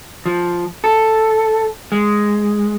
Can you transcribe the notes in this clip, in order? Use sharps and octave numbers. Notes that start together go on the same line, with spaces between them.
F3
A4
G#3